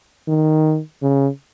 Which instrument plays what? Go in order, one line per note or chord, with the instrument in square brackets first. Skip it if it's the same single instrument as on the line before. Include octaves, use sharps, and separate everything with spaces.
[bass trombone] D#3
C#3